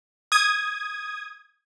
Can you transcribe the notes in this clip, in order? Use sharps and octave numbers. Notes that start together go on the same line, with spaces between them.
D#6 G#6